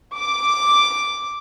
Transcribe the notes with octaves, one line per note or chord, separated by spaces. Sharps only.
D6